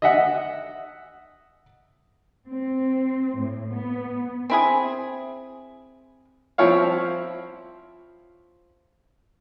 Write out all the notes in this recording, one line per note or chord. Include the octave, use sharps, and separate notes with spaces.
D#5 E5 F#5
C4
A2
B3
C4 E4 G#4
F3 C4 E4 C#5 F5